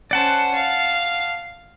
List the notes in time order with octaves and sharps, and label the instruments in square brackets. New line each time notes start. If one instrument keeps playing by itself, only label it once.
[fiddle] C#4 C5 [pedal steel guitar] D5 F#5 A5
[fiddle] F5